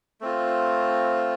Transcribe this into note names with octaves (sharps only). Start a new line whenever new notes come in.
A3 C4 F4